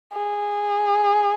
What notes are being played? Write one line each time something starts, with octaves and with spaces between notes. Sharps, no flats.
G#4